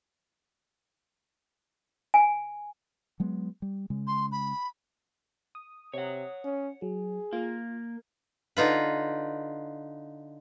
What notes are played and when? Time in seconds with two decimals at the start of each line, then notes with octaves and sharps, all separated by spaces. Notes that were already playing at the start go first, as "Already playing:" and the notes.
2.14 G#5
3.20 F#3 G#3 B3
3.62 G3
3.90 C#3 G#3
4.07 C6
4.31 B5
5.55 D#6
5.93 C3 C#5 F#5
6.44 C#4
6.82 F#3 G#4
7.33 A#3 F4
8.57 D3 D#4 F4 B4